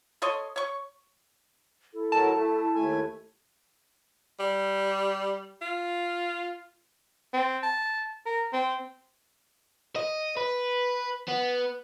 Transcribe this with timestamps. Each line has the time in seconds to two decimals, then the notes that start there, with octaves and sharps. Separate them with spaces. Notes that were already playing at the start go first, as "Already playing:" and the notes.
0.22 A4 C#5 D#5 C6
0.56 C#5 C#6
1.93 E4 A4
2.12 F#3 A3 A#4 A5
2.34 A3
2.75 D#2 A3 G#5
4.39 G3
5.61 F4
7.33 C4
7.63 A5
8.26 A#4
8.53 C4
9.96 D#5
10.37 B4
11.28 B3